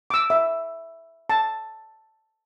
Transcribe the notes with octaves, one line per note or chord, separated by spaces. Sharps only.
D6 E6
E5
A5